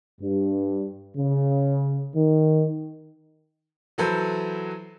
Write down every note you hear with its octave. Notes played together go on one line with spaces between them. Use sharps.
G2
C#3
D#3
E3 F#3 A4 B4 C5